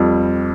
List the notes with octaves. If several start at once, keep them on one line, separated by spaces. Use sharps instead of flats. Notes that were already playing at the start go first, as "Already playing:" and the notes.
Already playing: F2 G3